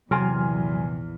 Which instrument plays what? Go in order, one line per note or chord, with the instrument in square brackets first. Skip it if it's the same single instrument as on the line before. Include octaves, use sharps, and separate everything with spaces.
[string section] A#1 E2 [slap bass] C3 [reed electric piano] F#3 [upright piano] G#5 C6 F6